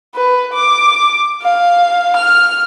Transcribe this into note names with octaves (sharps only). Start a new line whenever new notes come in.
B4
D6
F5
F6